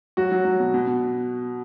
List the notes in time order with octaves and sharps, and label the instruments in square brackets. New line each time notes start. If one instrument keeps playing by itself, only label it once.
[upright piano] F#3 F#4
F#3
F#3
B2
B2
B2